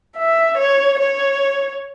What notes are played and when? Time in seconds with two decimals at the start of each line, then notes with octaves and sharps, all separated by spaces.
0.18 E5
0.58 C#5
0.99 C#5